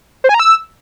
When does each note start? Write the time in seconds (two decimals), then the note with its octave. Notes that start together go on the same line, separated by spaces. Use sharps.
0.24 C5
0.29 G#5
0.34 A#5
0.40 E6